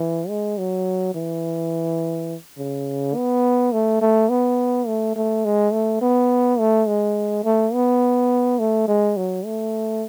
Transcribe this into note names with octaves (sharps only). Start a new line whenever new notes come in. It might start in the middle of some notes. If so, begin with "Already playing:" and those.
Already playing: E3
G#3
F#3
E3
C#3
B3
A3
A3
B3
A3
A3
G#3
A3
B3
A3
G#3
A3
B3
A3
G#3
F#3
A3